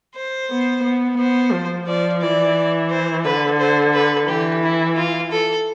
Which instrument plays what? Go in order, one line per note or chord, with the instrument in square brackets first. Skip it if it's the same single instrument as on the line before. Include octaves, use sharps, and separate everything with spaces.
[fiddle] C5
[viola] B3
B3
[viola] B3 [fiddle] C5
[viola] F3
[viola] F3 [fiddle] D5
[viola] E3 [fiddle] D5
[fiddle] C5
[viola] D3 [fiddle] B4
[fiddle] C5
B4
[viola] E3 [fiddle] G4
[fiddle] E4
F4
A4